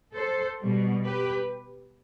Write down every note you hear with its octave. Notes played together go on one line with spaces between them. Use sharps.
A4 C5
B2 G3
G4 B4